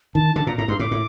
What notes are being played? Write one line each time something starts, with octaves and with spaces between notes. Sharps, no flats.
D#3 A5
D3 A5
A#2 A#5
A2 A#5
G2 C6
A2 D6
A2